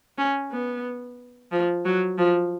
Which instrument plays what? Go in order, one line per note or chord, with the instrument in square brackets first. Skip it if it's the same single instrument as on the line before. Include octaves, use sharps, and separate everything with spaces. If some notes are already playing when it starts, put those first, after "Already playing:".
[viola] C#4
B3
F3
F#3
F3